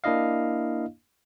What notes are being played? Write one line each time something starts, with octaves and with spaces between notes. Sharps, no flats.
A#3 D4 E4 D#5 F5